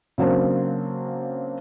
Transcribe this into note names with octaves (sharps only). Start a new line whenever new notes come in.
C#3 F#3 A#3 C4 D4